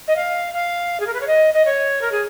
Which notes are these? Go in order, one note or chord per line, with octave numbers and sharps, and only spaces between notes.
D#5
F5
F5
G#4
A#4
B4
C#5
D#5
D#5
C#5
A#4
G#4